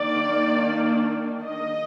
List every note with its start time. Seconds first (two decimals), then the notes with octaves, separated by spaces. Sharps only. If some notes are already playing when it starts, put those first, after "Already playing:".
Already playing: D#3 A#3 D4 D5
1.45 D#5